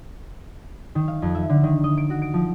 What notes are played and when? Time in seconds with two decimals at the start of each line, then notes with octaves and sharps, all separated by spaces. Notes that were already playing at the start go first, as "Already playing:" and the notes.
0.95 D#3
1.08 F5
1.22 F2
1.35 E5
1.49 D3
1.64 D#3
1.84 D#5
1.97 D7
2.10 F#4
2.22 D7
2.34 F3